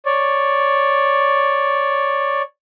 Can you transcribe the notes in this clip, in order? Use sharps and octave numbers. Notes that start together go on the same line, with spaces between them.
C#5 D5